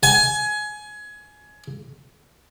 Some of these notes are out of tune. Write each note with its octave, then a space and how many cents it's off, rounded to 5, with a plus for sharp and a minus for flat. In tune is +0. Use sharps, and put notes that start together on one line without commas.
G#5 +20